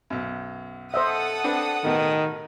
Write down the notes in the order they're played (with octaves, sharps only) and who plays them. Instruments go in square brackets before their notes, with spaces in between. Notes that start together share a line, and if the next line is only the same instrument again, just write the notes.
[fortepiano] B1 F#2
[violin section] A4 F#5 D#6 [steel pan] C5 D#5 E5
[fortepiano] C4 D4 B4
[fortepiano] A1 B2 B3 [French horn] D#3